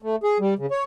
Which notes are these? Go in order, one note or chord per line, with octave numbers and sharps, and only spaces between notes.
A3
G#4
G3
C#3
C#5